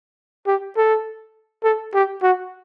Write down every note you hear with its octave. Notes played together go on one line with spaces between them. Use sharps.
G4
A4
A4
G4
F#4